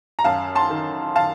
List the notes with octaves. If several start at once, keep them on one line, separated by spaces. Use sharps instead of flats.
A#5
F#2 F5 A5
A5 C6
D#3
F5 A5